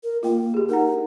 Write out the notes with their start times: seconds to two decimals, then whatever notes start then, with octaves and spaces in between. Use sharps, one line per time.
0.03 A#4
0.23 A#3 F4 G5
0.54 G4 G#4
0.69 D#4 A#4 F#5 A#5